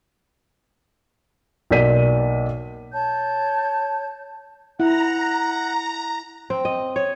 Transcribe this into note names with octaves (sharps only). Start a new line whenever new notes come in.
B1 A#3 D5 B6 D#7
C#5 A5 G6
E4 F#5 A#5
C4
D#5
C#5